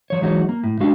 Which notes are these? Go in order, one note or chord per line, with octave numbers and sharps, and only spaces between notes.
F3 C#5
E3 F#3 G#3 D#4 F#4 C#5
A#3
A2
C2 G#3 D4 F#4 F5